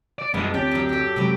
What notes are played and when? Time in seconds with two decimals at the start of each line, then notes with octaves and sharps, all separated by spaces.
0.19 D5
0.34 F#2 G3 G#3 B3 D4 E4 F4
0.54 D2 A#3 C4 C#4 G4 D5
0.71 F#2 F#3
0.89 F#4 A4
1.16 C3 F#3 G#3 C4 F#4 B4